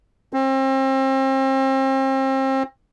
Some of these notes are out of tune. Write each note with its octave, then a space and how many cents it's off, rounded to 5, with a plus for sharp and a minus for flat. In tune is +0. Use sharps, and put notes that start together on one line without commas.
C4 +35